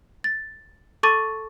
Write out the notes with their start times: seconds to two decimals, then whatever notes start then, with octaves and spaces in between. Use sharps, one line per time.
0.24 A6
1.03 A4 A5 C#6 D6 A6 D#7